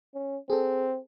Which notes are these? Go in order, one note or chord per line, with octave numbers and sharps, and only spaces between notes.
C#4
C4 G#4 A4